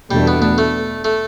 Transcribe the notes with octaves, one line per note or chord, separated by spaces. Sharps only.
E2 B2 G3 A3 D4
B3
B3
A3
A3